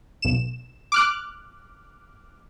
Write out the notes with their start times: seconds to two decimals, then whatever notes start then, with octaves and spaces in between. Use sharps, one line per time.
0.22 B1 E7
0.92 D6 F6 F#6